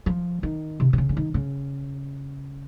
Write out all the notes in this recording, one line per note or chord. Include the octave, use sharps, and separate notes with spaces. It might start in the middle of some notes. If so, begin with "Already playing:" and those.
F3
D#3
C3
C3
C#3
D3
D#3
C#3